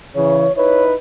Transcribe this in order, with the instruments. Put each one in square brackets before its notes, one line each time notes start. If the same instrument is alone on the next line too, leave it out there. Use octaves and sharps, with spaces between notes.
[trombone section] C#3 E3 [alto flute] C#5
[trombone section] D#4 E4 B4 [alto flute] C#5